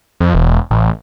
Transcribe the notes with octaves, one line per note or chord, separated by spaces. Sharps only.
F2
E1
A1